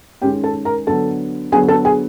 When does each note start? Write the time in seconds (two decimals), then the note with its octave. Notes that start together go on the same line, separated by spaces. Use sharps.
0.22 D#3 G#3 C#4 G4 G5
0.44 A4 A5
0.65 A#4 A#5
0.87 D3 F#3 B3 A4 A5
1.52 D3 F#3 B3 G#4 G#5
1.68 A4 A5
1.85 G#4 G#5